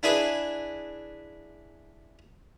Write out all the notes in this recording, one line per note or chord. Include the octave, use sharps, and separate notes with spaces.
D4 E4 G#4 B4